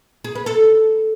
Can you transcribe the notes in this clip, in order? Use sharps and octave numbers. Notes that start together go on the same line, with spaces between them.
G#4
B4
A4